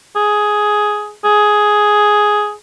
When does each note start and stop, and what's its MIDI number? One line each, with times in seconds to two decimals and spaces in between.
0.16 1.13 68
1.25 2.53 68